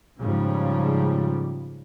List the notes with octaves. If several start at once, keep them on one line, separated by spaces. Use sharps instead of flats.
G#2 C#3 F3 G3